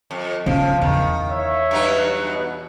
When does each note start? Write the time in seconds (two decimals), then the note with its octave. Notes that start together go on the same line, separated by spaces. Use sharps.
0.11 F2
0.46 C#3 F3 F5
0.82 E2 D#3
1.30 C#5 E5 F5
1.71 G2 F#3 D#4
2.20 B2